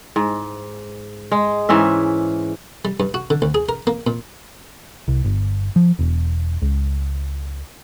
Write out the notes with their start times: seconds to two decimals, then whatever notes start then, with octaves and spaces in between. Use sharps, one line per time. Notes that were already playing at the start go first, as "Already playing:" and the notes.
0.16 G#2
1.32 G#3
1.69 G#2 E3 C#4 E5
2.85 G3
3.00 G2
3.14 F#4
3.30 D3
3.42 D2
3.54 G#4
3.69 A#4
3.87 A#3
4.07 A#2
5.08 C2
5.25 G1
5.76 F3
5.99 E1
6.62 C#2